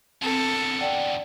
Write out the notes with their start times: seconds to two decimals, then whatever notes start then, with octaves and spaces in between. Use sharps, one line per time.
0.22 E2 D3 C4 A4
0.81 D5 F#5 G5